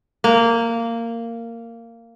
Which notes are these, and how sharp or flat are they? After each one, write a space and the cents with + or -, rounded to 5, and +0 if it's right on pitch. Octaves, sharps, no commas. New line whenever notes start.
A#3 -15